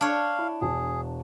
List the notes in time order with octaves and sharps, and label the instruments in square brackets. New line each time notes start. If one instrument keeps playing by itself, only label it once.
[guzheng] D4 C#5 [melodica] F5
[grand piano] E4
[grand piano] E1 A5 [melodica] G#4